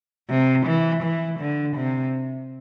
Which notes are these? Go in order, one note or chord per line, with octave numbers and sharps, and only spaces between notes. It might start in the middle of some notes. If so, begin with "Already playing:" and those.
C3
E3
E3
D3
C3